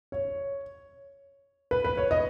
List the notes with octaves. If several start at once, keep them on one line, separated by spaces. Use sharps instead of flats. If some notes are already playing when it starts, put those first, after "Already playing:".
C#5
B4
B4
C#5
D#5